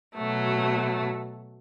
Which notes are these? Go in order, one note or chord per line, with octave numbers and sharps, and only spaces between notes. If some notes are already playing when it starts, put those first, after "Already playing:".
B2 F#3 A3